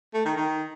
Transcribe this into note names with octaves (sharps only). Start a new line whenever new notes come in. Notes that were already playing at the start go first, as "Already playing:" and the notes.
A3
D#3
D#3